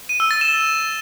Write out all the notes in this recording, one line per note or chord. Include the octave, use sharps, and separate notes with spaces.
D#7
E6
A6
E7